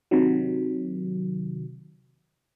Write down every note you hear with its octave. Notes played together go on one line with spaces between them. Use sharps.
C3 D#3 F#3